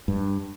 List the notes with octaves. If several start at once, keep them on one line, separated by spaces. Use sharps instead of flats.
G2